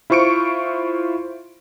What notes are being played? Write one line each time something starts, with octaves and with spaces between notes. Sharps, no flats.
E4 F4 C5 C#6 C#7 D7